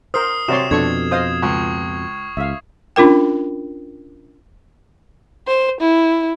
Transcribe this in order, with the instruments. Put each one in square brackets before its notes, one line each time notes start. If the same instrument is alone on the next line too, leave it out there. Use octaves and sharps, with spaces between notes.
[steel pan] A#4 C5 [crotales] D#6 F6 C7
[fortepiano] C3 C#5 [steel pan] F#4 D5 C6 [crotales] E7
[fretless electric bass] F2 B2 [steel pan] D4 A4 C#6 [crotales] G#6
[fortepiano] C5 [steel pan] D#5 F5 D#6
[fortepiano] C#2 [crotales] C#6
[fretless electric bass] C#2 [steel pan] E5 F5
[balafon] C#4 D4 F4 A#4 G5
[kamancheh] C5
E4